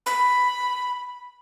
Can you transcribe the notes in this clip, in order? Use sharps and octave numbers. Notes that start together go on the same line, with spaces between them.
B5